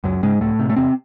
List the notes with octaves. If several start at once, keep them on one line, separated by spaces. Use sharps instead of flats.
C#2 F#2 F#3
G#2 C#3 G#3
C#2 A2 A3
C3
A3
E2 C3 C4